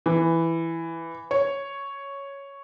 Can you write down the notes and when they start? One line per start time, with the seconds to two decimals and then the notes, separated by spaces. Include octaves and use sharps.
0.06 E3
1.31 C#5